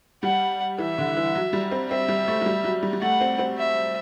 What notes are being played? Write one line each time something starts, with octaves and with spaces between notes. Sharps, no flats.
G3 F#5
E3 E5
D3
E3
F#3
G3
C4
C4 E5
G3
A3
F#3
G3
F#3
G3
G3
A3 F#5
C4
C4
E5